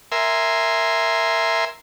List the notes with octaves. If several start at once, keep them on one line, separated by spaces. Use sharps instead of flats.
A#4 E5 G#5 C6